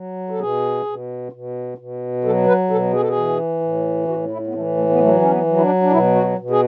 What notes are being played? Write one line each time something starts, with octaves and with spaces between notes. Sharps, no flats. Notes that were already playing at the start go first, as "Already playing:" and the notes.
Already playing: F#3
A4
B2 G#4
B2
B2
B2
F#3 A4
B4
B2 A4
G#4
A4
G#4
E3
A2
A2 F#4
E4
B3
E3 A3
A3
B3
F#3 A3
C#4
B3
F#3
E4
D4
D4
B2 E4
F#4
B2
G#4